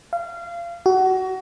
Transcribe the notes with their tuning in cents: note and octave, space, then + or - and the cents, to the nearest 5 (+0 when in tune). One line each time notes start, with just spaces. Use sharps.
F5 -25
F#4 +25